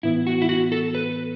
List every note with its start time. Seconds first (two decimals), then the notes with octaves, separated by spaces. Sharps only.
0.03 A2 E3 B3 E4
0.27 F#4
0.42 E4
0.49 F#4
0.72 A4
0.95 B4